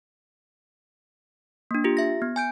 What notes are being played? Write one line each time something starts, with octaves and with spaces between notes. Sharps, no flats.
A#3 D4
F4 G4
E5 A#6
B3
G#5 G6 D7